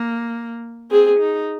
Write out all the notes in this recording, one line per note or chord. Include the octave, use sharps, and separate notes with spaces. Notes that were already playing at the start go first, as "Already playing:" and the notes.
Already playing: A#3
C4 G#4
D#4